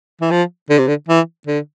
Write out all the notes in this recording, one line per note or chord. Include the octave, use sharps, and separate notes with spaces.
E3
F3
D3
C3
D3
E3
D3